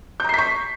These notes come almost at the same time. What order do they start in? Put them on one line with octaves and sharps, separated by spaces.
G6 A#5 C7 B6 C#6